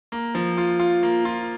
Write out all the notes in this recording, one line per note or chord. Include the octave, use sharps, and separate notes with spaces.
A#3
F3
F4
F4
A#3
F4